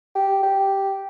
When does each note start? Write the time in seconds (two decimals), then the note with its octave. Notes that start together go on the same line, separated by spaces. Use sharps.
0.15 G4
0.43 G4